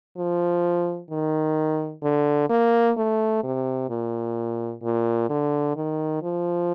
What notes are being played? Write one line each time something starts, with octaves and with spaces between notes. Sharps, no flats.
F3
D#3
D3
A#3
A3
C3
A#2
A#2
D3
D#3
F3